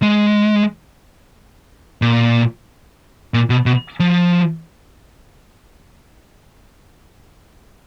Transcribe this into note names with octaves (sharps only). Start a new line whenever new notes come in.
G#3
A#2
A#2
B2
B2
F3